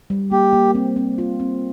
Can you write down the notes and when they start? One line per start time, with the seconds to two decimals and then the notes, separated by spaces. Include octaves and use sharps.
0.10 G3
0.32 A#3 G4
0.53 A#3
0.75 C4
0.96 C4
1.18 F4
1.40 C4